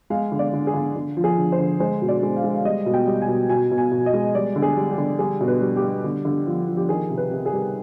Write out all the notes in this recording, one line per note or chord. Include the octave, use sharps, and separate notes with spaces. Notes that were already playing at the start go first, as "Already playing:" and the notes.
G#3 F5
D3
D5
D3
G#4
D3
D3
F3
G#4
D3
C5
D3
G#3 C5
B2
D5
G#3
F5
G#3
F5
G3 D#5
B2
G5
G3
G#5
B2
B2 G#5
B2
G#5
B2
D#5
G#3
G3 D5
D3
G#4
G3
G4
D3
G3 G#4
B2
B4
G3
G4
G3
D3
D3
F3
F3
G4
D#3 G#4
C3
B4
C3
G#4
G3